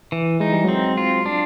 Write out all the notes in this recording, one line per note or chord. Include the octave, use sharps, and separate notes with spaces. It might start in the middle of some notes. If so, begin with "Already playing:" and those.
E3
G#3 D#4
G3
F#3 G#3 C4
F4
D4